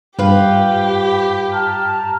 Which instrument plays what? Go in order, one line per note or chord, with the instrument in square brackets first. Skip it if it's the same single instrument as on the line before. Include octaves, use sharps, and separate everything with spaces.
[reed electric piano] G2 [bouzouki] F4 B4 [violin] G4 [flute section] C5
[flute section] A5 A#5 F6